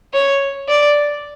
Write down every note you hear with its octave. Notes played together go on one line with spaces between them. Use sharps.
C#5
D5